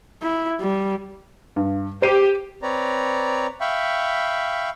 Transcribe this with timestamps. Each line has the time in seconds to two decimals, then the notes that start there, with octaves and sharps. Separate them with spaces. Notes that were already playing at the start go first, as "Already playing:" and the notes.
0.22 E4
0.60 G3
1.56 G2
2.02 G4 C5 C7 D#7
2.63 C4 B4 C#5 D5 A#5
3.61 E5 F5 G5 B5 C#6